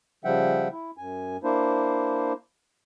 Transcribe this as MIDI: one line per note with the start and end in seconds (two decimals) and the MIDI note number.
0.24 0.68 49
0.24 0.68 53
0.24 0.68 55
0.24 0.68 76
0.24 0.68 78
0.24 0.68 79
0.72 0.91 64
0.97 1.37 42
0.97 1.37 80
1.43 2.33 58
1.43 2.33 62
1.43 2.33 64
1.43 2.33 72